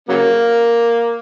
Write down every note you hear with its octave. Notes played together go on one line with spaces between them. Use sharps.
C#3 F#3 A#3